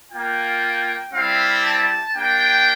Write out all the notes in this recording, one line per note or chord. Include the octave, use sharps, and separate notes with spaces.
A#3 F4 G5
G3 C4 E4 G4 F5
A5
A#3 D4 G4 G5